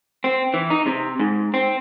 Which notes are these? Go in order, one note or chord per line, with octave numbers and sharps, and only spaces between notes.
C4
E3
D#4
C3
G#2
C4